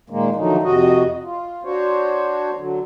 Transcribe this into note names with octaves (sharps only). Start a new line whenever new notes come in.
A#2 D#3 G#3 A#3
D3 D#3 F3 F#3 A3 D#4
F2 C3 F#4 D#5
F4
D4 F#4 C5 C#5
D3 F#3